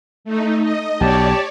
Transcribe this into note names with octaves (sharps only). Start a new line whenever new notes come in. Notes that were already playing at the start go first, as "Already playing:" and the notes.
A3 D#4
D#5
B1 G4 C#5 D5 A5